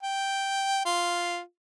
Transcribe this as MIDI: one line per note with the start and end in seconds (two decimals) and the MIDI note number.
0.03 0.82 79
0.85 1.39 65